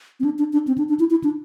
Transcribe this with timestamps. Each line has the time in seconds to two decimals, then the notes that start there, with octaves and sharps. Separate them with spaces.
0.20 C4
0.24 D4
0.39 D4
0.53 D4
0.68 C4
0.78 D4
0.89 D4
0.99 E4
1.10 E4
1.24 D4